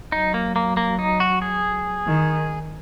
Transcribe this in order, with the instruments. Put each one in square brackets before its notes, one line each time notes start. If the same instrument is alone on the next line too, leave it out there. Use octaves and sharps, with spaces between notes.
[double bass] F#3 [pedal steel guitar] D#4
[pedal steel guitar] A#3
A#3
A#3
D#4
F#4
G#4
[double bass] D#3